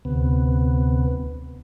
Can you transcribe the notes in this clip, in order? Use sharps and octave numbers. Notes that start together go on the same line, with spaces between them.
D2 C3 B3